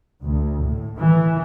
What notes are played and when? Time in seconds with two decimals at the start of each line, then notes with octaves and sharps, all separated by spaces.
0.21 D2
0.63 A2
0.99 E3